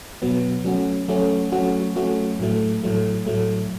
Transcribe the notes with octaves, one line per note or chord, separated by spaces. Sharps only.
B2 F#3 B3
F#3 A3 C#4 F#4
F#3 A3 C#4 F#4
F#3 A3 C#4 F#4
F#3 A3 C#4 F#4
A2 F#3 A3
A2 F#3 A3
A2 F#3 A3